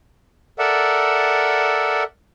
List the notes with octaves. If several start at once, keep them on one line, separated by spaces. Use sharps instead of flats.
A4 A#4 D5 E5 F#5